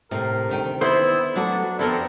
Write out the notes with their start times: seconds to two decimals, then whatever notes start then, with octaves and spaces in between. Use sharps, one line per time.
0.11 A2 C3 A#4
0.49 D2 D#3 G5
0.81 B3 E4 C5
1.36 F#3 A3 D4 F#4
1.79 F2 B3 C4 D4 E4 A4 A#4